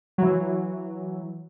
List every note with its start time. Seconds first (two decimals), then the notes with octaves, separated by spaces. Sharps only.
0.18 E3 F#3